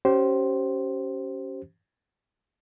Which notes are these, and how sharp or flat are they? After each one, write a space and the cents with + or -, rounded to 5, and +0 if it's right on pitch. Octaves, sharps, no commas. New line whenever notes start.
C#4 +0 G4 -30 C5 +5